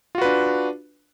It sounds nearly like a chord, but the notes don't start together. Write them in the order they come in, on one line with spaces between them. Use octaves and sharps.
F4 F#4 B4 D4